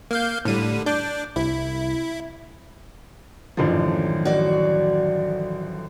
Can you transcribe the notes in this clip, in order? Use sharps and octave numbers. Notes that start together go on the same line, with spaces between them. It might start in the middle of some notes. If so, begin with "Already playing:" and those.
A#3 F5 G6
A2 D3 G3 D#7
D4 D6 G6
C2 E4
A1 F#2 D3 D#3 F3 A4
F#4 D5